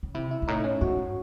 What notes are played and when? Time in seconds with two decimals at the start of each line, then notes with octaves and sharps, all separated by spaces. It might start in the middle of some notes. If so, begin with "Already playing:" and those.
0.03 C#3
0.15 C3 E4
0.31 E4
0.42 G#2
0.48 A2 D#4
0.64 C#4
0.81 G#2 F#4